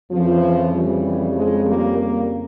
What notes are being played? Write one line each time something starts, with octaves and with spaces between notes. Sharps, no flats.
F2 C#3 E3 F3
E3 G3
F3 G#3
G3 A#3
G3 A#3